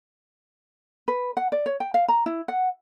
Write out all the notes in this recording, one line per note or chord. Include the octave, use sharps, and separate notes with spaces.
B4
F#5
D5
C#5
G5
F5
A#5
E4
F#5